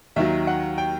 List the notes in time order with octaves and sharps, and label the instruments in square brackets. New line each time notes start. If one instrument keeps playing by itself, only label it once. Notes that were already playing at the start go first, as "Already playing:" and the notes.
[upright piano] D#2 D#3 F#3 E5
F#5
G5